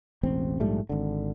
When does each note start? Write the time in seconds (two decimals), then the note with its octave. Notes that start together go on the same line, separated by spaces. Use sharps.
0.23 E1 A1 C4
0.60 A#1 G#2 G3 A3
0.89 G#1 D3